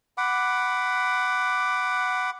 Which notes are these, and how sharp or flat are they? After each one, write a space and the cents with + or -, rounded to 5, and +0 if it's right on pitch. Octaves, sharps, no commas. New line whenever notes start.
F#5 +5 B5 +10 D6 +0